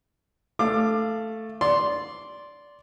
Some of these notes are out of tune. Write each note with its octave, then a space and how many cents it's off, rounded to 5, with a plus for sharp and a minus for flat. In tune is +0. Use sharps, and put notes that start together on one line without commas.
A3 +0 F5 -15 D6 +20
D5 -15 C6 +0